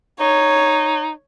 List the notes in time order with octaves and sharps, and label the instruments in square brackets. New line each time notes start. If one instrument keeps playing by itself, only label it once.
[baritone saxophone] D#4 [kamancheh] C#5